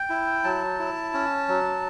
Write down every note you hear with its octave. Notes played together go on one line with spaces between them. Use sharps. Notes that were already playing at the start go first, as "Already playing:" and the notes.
Already playing: G5
E4
F#3 A5
E4
C#4
F#3